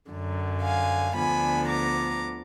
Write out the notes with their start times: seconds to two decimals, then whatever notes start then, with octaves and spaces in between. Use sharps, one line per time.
0.10 F#2 D3 F#3
0.63 F5 G#5
1.15 D2 D3 F3 B3 D4 G#5 B5
1.68 A#5 D6